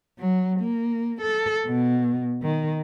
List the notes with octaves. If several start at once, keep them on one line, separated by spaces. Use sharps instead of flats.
F#3
A#3
A4
B2
D#3